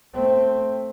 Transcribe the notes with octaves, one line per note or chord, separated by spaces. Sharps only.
A3 C4